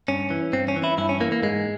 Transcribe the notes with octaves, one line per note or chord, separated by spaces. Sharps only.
G2 C#4
E3
G2 C4
C#4
E3
E4
G2 E4
C#4
E3 A#3
A#3
G#2 G#3